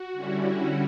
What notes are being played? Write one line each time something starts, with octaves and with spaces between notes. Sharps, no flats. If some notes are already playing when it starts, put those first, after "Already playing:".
Already playing: F#4
D3 G3 C#4 E4